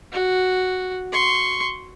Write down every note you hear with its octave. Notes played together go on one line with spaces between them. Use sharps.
F#4
C6 C#6